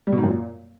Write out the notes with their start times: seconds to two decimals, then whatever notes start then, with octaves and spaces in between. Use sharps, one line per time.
0.07 G3
0.12 B2
0.18 G#2
0.23 F#2
0.29 A#2